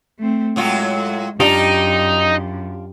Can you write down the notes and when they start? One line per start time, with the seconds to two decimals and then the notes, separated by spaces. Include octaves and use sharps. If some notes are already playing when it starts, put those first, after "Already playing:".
0.19 A3 C4
0.56 A2 F#3 G#3 F4
1.40 F#2 D4 D#4 F4 G4